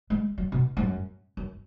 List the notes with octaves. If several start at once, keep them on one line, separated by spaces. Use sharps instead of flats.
G#3
F#3
B2
G#2
F#2
F#2